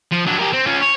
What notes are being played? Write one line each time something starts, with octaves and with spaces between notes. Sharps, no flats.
F3
F#3 D4
G4 A#4
C4
C#4 F4
C#5